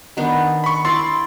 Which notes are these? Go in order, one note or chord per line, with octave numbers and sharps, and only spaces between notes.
D#3 B3 D4
B5 C#6
E4 D5 C6 A6